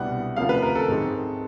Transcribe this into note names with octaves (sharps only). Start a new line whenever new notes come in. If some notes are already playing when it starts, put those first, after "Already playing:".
Already playing: C2 B2 G3 B3 D4 F#5
D2 C3 F3 A#3 C#4 F5
B4
A#4
A4
G#2 D#3 G#3 C4